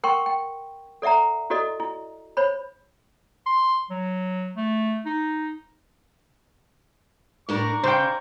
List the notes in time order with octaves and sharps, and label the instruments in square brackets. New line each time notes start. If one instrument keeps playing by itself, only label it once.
[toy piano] A#4 F#5 G5 C6 C#6
G5
A4 D5 E5 F#5 A#5
E4 F#4 A4 D5 D#5
E4
C5 C#5 B5
[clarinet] C6
F#3
A3
D#4
[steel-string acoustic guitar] A2 D4 A#4 [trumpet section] D5 A#5 C#6
[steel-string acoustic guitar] C#3 [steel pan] C5 G5